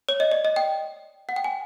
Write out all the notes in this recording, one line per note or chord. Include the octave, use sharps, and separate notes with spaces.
C#5
D#5
D5
D#5
G5
F#5
G5
G#5